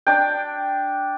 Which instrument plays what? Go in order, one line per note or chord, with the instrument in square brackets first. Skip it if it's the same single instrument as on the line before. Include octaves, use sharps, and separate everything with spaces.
[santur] D4 G5